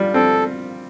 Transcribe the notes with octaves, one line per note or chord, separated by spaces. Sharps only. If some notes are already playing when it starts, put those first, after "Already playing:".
Already playing: G3 F4
C4 A4